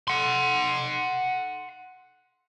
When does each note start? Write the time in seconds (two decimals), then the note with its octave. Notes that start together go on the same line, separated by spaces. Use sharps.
0.08 F#5 C6